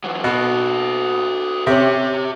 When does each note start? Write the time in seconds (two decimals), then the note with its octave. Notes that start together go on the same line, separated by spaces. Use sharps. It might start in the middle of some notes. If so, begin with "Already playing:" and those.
0.04 E3 F#3
0.24 B2 F#4 A4
1.67 C3 C#4 G4 E5